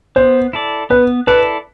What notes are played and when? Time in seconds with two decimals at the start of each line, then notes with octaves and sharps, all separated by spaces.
0.16 B3 C5
0.53 E4 A4 D5
0.90 B3 B4
1.27 E4 A4 B4 D5